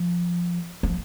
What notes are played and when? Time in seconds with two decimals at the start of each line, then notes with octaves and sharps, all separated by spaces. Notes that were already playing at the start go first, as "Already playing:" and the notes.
Already playing: F3
0.83 F3